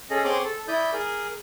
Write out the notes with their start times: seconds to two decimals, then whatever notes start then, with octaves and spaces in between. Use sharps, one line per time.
0.10 C#4 G#4 A4 D#5
0.24 C4 G#4 C#5 C6 D6
0.44 A4
0.68 E4 D5 B5 D#6 G6
0.93 G#4 A#4